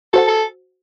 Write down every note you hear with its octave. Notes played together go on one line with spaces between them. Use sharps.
F#4 A4 C5 F#5
A4